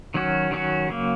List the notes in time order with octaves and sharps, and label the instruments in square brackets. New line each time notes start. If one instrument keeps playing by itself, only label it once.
[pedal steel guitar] D#3 F#3 C#4 F#4
D#3 F#3 C#4 F#4
C#3 F#3 A#3